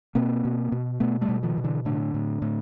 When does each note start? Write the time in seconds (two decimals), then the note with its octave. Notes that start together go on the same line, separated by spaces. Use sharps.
0.15 B2 A#3 C4
0.45 B2
0.72 B2
1.00 B2 A3 B3
1.21 G3 A3
1.28 B2
1.43 D#3 F3
1.58 B2
1.64 D3 E3
1.85 A2 D3
2.14 A2
2.42 A2